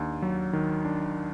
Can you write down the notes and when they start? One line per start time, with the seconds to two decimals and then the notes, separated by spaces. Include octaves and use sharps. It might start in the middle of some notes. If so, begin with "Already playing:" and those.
Already playing: D#2 D4
0.22 F#3
0.53 D#3
0.85 D4